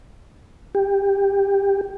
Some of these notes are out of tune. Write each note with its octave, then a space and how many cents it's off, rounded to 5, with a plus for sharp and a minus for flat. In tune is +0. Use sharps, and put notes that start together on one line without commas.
G4 +15